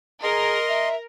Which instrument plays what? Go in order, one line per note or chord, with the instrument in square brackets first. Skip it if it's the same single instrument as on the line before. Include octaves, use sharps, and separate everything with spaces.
[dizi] G#4 [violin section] A#4 [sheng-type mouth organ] D#5 C6
[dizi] E5